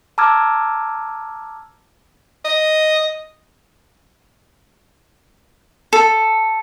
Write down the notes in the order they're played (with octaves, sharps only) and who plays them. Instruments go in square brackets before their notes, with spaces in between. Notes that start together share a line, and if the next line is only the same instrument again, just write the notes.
[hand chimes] A5 A#5 D6 E6 F6 G#6
[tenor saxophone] D#5
[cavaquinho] A4